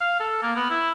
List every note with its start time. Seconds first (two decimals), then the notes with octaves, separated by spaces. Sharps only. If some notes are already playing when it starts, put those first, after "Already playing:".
0.01 F5
0.20 A4
0.43 A#3
0.56 B3
0.70 E4